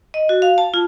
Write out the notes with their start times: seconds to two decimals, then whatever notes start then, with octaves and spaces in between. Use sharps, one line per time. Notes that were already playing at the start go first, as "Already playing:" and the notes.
0.14 D#5
0.29 F#4
0.42 F5
0.58 A5
0.74 F4